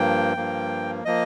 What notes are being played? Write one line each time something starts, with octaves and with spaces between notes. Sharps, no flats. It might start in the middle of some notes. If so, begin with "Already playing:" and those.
Already playing: G2 F3 A#3 G5
G2 F3 A#3
F3 A#3 D#5